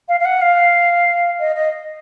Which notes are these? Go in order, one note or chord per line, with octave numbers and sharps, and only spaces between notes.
F5
F5
F#5
F5
D#5
D#5